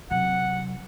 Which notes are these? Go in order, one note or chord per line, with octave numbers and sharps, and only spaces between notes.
C3 F#3 F#5